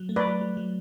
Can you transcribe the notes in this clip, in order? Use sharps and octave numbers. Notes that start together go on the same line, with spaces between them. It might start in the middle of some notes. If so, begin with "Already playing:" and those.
Already playing: F#3
A3
B4 D5
F#3
F#3
F#3